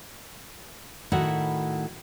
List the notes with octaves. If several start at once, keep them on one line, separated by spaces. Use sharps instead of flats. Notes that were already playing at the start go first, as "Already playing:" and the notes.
A2 D#3 E4 F#4 F#5